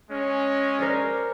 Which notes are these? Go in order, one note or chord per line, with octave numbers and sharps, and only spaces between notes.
G#3 C#4
A#4 C5 D5